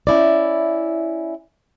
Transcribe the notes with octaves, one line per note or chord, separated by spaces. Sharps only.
C#4 E4 D5